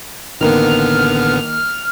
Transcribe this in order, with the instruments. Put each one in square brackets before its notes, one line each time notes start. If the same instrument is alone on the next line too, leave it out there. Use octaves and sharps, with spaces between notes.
[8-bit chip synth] A1 D3 B3 [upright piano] D#3 A#3 [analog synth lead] F6